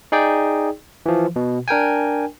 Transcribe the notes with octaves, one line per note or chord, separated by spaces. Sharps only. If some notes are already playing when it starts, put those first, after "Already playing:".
D#4 G#4 D5 G5
E3 F3
B2
D4 A#4 G5 G#5